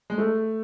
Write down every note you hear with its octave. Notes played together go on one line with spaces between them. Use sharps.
G#3
A3